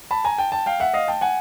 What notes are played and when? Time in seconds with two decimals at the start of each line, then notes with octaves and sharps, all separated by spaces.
0.11 A5 B5
0.24 G#5 A#5
0.38 G5 A5
0.52 G5 A5
0.66 F5 G5
0.80 E5 F#5
0.94 D#5 F5
1.08 G5 A5
1.21 F#5 G#5